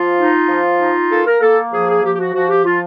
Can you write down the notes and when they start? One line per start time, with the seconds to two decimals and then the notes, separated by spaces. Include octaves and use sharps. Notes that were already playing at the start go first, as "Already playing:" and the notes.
Already playing: F3 F4
0.17 D#4
0.48 F3
0.79 D#4
1.10 A#3 A4
1.25 A#4
1.40 A#3 A4
1.71 F3 G#4
1.87 G#4
2.02 F3 G4
2.14 G4
2.18 F#4
2.33 F3 F#4
2.48 G4
2.64 F3 F4